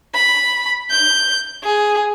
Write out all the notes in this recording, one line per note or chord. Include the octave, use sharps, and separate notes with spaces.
B5
G6
G#4